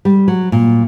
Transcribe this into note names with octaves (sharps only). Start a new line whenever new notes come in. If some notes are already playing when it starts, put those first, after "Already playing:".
G3
F#3
A#2